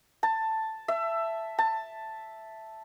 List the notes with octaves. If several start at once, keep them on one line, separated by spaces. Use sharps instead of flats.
A5
E5
A5